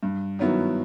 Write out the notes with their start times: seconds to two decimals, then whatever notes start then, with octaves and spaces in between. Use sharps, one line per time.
0.03 G2
0.39 D#3 F#3 B3 E4